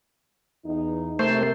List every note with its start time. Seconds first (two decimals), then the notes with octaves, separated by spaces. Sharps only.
0.65 E2 D#4
1.19 C3 A3 A#4 C5